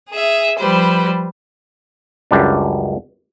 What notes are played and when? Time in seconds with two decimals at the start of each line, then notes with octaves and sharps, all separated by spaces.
0.10 G#4 E5
0.58 F3 G3 B4 C5
2.31 C#2 F#2 G3 D4